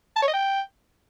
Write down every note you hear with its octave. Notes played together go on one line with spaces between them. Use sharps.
A5
C#5
D#5
G5